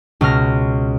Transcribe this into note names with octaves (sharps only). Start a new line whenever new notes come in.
C#2 B2 F6 A#6